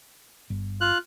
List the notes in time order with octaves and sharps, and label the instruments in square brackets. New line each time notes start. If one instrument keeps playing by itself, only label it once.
[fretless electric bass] G1
[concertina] F4 F#6